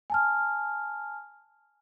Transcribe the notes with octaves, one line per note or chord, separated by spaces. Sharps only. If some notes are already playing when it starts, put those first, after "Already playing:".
G#5 A5 F6